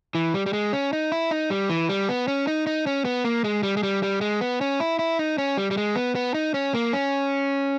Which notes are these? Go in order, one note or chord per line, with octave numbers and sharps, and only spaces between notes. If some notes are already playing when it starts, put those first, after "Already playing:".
E3
G3
G3
G#3
C#4
D#4
E4
D#4
G3
E3
G3
B3
C#4
D#4
D#4
C#4
B3
A#3
G#3
G3
G#3
G3
G3
G#3
B3
C#4
E4
E4
D#4
C#4
G3
G3
G#3
B3
B3
D#4
C#4
A#3
C#4